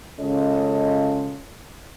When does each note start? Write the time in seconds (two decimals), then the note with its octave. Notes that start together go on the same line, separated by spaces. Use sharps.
0.20 C#3 G#3 C#4 F4 A4 D#5